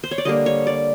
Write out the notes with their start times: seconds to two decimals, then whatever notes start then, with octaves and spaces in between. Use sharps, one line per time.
0.04 C5
0.11 C#5
0.18 D5
0.25 D3 G3 A#3 D#5
0.46 C#5
0.67 D5